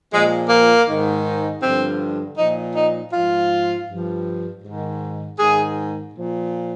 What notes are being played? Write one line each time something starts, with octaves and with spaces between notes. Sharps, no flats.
A#2 F3 G#3
A#3
G#2 D#3
G2 D3 F3 C4
A#2 F3 D#4
D#4
G#2 F3 F4
G2 F3
G#2
D#3
G#2 D#3 G#4
A#2 F3